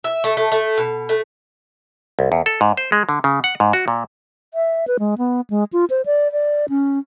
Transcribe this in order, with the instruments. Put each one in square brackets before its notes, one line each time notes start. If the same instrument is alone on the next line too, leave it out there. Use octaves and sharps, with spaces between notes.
[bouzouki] E5
A3
A3
A3
B2
A3
[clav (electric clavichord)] C2
E2
A4
G#2
C5
G#3
D3
C#3
F#5
G#2
F#4
A#2
[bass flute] E5
B4
G#3
B3
G#3
F4
C5
D5
D5
C#4